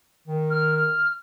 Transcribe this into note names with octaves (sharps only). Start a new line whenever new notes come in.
D#3
F6
F6